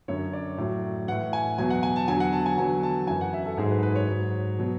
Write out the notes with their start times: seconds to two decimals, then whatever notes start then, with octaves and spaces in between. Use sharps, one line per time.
0.08 F#2 D3 F#3 C#5
0.33 D5
0.58 A2 F#3
1.08 A2 E3 F#5
1.33 G#5
1.58 E2 B2 F#3 G#5
1.70 F#5
1.83 G#5
1.96 A5
2.08 E2 D3 F#3 G#5
2.20 F#5
2.33 A5
2.46 G#5
2.58 E2 D3 F#3 G#5
2.83 A5
3.07 F#2 E3 G#5
3.21 F#5
3.33 E5
3.45 A4
3.57 G#2 F#3 G#4
3.71 B4
3.83 B4
3.96 C#5
4.08 G#2 F#3
4.58 B2 F#3